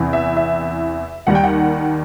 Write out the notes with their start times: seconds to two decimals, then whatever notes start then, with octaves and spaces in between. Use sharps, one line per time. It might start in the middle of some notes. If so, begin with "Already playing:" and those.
Already playing: E2 C3 E3
0.13 E5
0.37 E5
1.27 D#2 D#3 G3 F#5
1.35 G5
1.44 F#5